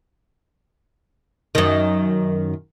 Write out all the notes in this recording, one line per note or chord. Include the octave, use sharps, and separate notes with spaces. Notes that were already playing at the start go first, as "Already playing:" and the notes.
F#2 D#3